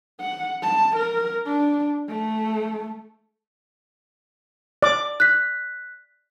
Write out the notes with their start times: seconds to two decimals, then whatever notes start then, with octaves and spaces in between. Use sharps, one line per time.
0.21 F#5
0.63 A5
0.96 A#4
1.46 D4
2.09 A3
4.83 D5 D6
5.20 F#6 B6